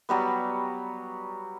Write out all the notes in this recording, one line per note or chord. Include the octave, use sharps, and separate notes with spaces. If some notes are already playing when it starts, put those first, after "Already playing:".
F#3 G3 B3